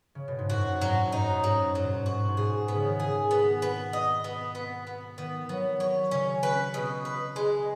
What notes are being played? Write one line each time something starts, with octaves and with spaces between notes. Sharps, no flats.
C#3
B2
G#2
F#2 F#4
B2
G#2 F#3
G#2
F#2 D#4
G#2
F#2 F#3
G#2 F#3
B2
G#2
G#2 F#4
G#2
B2 G#4
B3
C#3
D#3
G#4
B3
B3
D#5
B3
B3
B3
D#3 B3
F#3 B3
F#3 C#5
C#3 C#4
B4
B2
B4
G#3